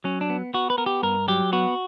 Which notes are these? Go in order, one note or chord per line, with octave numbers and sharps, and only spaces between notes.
F#3 C#4
D4
B3
B3 F#4
B4
B3 A#4
G4
G2 A#4
F#3 G4
B3 F#4